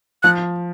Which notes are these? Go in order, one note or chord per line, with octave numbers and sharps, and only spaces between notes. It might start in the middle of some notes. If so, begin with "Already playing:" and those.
F3 F#6